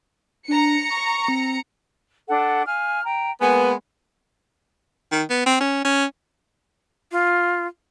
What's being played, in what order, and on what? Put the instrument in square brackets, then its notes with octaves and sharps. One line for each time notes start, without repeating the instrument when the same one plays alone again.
[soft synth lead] D4 [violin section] A#5 C#7
[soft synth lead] C#6
C4
[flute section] D4 A4 F#5
F5 G#5 F6
G5 A#5
[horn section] G#3 A#3 B3 [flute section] B4 G#5
[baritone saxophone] D#3
B3
C4
C#4
C#4
[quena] F4